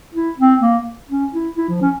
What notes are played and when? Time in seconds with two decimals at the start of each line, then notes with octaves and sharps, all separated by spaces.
0.15 E4
0.38 C4
0.61 A#3
1.10 C#4
1.33 E4
1.58 E4
1.69 F3
1.82 C#4